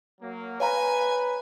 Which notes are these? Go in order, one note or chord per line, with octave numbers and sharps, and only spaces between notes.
F#3 A#3
B4 C#5 F5 G#5 A#5